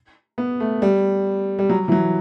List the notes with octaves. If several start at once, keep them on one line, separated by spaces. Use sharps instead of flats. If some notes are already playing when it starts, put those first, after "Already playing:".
B3
A3
G3
G3
F#3
E3
F#3